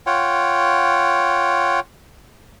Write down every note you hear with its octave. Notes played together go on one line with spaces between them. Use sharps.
F4 C#5 F#5 G5